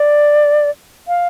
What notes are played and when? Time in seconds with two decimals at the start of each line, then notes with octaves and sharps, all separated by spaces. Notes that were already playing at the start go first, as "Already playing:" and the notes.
Already playing: D5
1.08 F5